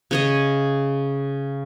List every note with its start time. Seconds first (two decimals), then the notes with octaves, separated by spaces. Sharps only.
0.11 C#3 C#5 D#5